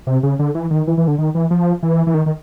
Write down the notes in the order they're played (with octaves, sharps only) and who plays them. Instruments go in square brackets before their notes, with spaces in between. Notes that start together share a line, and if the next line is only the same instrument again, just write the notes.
[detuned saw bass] C3
C#3
D3
E3
D#3
E3
E3
D3
D#3
E3
F3
E3
E3
D#3
D#3